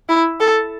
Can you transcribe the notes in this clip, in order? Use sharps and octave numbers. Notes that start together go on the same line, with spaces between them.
E4
A4